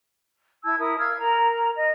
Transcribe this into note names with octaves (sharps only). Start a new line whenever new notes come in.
E4 A5 E6 G#6
E4 A#4 D#6
F5 E6 F6 G#6
A#4 A#5
D#5